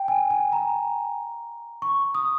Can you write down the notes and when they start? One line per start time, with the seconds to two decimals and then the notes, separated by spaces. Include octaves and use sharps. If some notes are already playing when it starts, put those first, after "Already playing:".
Already playing: G5
0.08 G#5
0.30 G#5
0.52 A#5
1.82 C#6
2.15 D#6